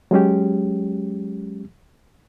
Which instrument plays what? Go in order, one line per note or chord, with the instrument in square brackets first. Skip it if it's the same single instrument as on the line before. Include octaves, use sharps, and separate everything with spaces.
[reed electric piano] F#3 G#3 C#4 G4